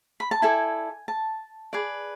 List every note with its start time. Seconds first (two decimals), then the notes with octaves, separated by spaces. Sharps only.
0.20 B5
0.31 A5
0.42 E4 A4 D5 G#5
1.08 A5
1.73 G#4 B4 D5